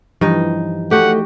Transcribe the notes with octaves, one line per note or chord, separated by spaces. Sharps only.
G2 E3 F3 D#4 D#5
A3 F#4 G4 A4 D#5 F#5